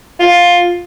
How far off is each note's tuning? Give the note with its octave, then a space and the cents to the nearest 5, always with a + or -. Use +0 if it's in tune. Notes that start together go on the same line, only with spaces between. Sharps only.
F4 +10